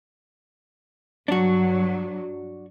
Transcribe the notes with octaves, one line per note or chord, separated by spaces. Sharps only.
G2 F#3 D4 F#4